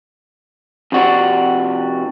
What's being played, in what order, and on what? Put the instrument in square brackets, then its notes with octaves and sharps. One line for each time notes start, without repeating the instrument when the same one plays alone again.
[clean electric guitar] F2 C3 F#4 D5 F#5